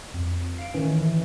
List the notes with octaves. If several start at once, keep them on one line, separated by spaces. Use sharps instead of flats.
F2
F5 D7
A2 D#3 E3 C#4